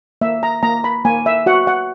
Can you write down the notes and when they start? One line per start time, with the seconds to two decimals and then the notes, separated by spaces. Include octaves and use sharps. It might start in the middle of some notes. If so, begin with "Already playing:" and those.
0.21 A#3 E5
0.43 A#5
0.63 A#3 A#5
0.84 B5
1.05 A#3 G#5
1.26 E5
1.46 F#4 F#5
1.67 F#5